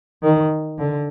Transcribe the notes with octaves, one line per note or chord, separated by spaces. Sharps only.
D#3
D3